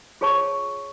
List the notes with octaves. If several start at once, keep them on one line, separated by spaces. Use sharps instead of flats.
F4 G#4 C#5 A5 C#6